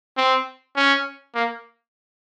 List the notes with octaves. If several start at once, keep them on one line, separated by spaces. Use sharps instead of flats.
C4
C#4
A#3